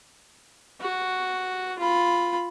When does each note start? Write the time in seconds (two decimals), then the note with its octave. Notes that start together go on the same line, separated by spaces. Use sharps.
0.81 F#4
1.78 F4 B5